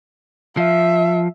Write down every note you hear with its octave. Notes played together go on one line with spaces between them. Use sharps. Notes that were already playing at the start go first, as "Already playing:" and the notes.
F3 E5